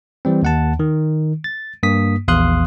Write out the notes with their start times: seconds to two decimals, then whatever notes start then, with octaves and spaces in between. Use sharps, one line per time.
0.25 E3 G3 C4
0.43 D#2 F#5 A5
0.80 D#3
1.44 A6
1.83 G2 A#3 D#6 B6
2.28 A#1 E2 F5 C6 D#6 F#6